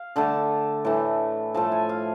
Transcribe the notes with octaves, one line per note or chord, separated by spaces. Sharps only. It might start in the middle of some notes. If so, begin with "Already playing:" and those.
Already playing: F5
D3 A3 A5
A2 E3 A3
A2 F3 A3 A5
G#5
F5